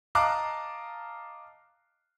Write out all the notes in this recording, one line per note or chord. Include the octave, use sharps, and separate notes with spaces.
D#5 F5 A5 A#5 D6 F#6